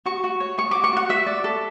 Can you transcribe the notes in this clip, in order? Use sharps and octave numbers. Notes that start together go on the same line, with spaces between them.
F#4 C#6
F#4
C#5
C#5 C#6
F#4 D6
C#6
F#4 F#5
F#4 E5
D5
A4